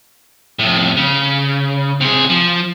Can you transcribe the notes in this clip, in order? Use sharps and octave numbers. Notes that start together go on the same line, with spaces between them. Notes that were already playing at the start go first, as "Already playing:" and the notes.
F2 A2
C#3
C3 G#4
F3